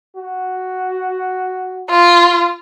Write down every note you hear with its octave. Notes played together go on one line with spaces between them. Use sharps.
F#4
F4